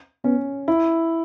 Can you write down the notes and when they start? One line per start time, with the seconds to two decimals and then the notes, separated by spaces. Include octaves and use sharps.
0.24 B3 C#4
0.68 E4